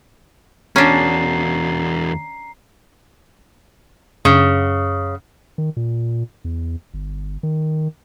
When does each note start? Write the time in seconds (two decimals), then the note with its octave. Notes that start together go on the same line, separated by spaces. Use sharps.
0.76 E2 C#4 D4 F#4 A#5 C7
4.25 F#2 C#3
5.58 D#3
5.77 A#2
6.44 E2
6.94 G1
7.43 D#3